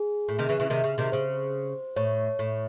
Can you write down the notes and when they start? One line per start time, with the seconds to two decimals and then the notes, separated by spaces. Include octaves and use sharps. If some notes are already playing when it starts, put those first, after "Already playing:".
Already playing: G#4
0.28 A2
0.39 C3 D#3
0.49 C#3 E3
0.60 C#3 E3
0.70 C3 D#3
0.84 C#3
0.98 C3 D#3
1.12 C#3 C5
1.96 A2 C#5
2.39 A2